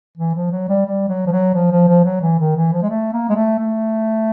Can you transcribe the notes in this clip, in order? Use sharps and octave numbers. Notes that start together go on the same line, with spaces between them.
E3
F3
F#3
G3
G3
F#3
F3
F#3
F3
F3
F3
F#3
E3
D#3
E3
F3
G#3
A3
A#3
G#3
A3
A3